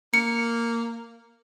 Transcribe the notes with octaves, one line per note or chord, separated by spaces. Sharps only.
A#3 C#7